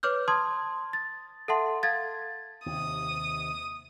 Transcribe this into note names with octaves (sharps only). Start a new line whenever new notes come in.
B4 C#5 D6 F6 G6
A5 C6 D#6 G#6
A6
A4 E5 F#5 A5 C6
A4 F5 G#6 A6
D#2 C3 D#6